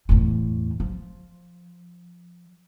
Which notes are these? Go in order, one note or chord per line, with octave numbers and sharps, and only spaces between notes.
E2 A2
F3